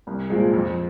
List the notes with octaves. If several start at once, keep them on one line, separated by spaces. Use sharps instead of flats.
C2
A#2 F3 G#3
F2